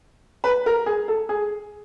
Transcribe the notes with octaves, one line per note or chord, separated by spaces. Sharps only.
B4
A#4
G#4
A4
G#4